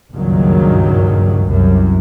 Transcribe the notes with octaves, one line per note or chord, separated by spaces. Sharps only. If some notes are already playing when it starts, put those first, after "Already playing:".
F#1 C#2 G2 A#2 D#3 F#3
C2 F#2